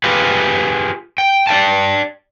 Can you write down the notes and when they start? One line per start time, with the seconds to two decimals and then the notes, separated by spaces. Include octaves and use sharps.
0.04 F4 G4 G#4 B4
1.18 G5
1.47 D5 E5 G5 A5